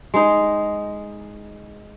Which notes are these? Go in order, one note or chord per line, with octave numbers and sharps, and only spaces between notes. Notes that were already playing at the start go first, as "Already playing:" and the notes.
G#3 D#4